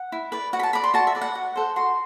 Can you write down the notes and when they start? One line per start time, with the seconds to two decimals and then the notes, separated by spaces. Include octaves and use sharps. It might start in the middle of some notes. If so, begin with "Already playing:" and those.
Already playing: F#5
0.12 E4
0.32 B4 D5
0.53 F#4 F#5
0.59 B5
0.63 A5
0.73 B4 D5 B5
0.84 C6
0.94 F#4 A5
1.07 E5
1.15 B4 D5
1.21 F#5
1.35 F#4
1.56 A4 C5
1.76 F#4 C6